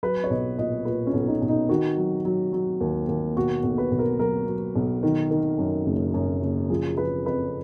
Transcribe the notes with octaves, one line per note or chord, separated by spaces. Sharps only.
F#3 B4
C#5
B1 D#5
A#2 D#5
A#2 B4
C#4
B1
D#4
B1
D#4
D#3 F#4
F#3
F#3
F#3
D#2
D#2
B2 F#4
B1
B4
B1
A#4
F#3 A#4
F#3
B1
D#3
D#3
F#2
F#1
F#2
F#1
F3 G#4
F3 B4
F2 B4